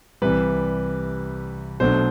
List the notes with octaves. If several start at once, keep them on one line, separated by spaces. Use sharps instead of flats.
C2 C3 E3 G3 B4
B1 B2 F#3 A3 D4 C5